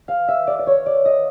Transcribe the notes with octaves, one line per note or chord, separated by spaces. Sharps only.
F5
E5
D5
D5
C#5
D5
D#5